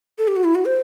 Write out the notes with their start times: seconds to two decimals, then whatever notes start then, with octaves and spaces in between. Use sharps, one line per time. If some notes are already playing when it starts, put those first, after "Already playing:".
0.18 A4
0.28 G4
0.36 F#4
0.44 E4
0.55 F#4
0.65 C5